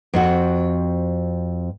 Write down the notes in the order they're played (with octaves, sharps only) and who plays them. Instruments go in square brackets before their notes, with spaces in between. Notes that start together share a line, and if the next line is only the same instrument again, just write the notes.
[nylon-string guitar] F2 C4 F#4